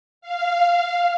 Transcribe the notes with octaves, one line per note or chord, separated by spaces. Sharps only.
F5